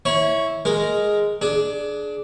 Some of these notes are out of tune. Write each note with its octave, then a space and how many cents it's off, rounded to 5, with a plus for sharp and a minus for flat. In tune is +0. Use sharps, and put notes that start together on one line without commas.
E4 -10 C#5 +0 B5 -40
G#3 +0 A#4 +0
D4 +0 G#4 +25